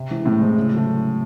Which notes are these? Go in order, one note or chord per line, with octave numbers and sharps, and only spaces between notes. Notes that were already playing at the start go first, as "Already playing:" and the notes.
Already playing: C3
E3 G#3 C4
A2 C3
E3 G#3 C4
C#3
F#3 A3